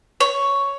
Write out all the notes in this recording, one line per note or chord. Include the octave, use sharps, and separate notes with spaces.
C#5